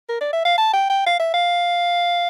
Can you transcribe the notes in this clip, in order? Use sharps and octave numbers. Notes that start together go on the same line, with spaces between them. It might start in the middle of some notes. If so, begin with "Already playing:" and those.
A#4
D5
E5
F5
A5
G5
G5
F5
E5
F5